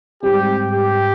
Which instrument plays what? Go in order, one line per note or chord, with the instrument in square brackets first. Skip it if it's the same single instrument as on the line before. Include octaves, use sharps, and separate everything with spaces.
[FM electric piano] G#2 G3 C4 [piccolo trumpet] G4
[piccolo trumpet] G4